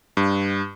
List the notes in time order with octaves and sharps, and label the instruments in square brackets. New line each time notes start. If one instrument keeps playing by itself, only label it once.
[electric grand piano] G2